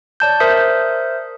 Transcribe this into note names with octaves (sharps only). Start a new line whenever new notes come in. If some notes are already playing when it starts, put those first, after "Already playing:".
C#5 D5 A5 G6
A#4 C5 E5 D#6